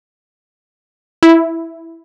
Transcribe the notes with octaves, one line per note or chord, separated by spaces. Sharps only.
E4